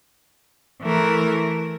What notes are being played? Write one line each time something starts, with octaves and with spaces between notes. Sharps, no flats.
E3 A3 E4 A#4